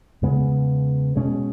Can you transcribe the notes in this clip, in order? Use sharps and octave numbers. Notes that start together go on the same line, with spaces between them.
E2 C#3 G#3 B3
B2 G#3 C#4